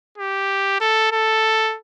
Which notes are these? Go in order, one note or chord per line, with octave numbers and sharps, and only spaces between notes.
G4
A4
A4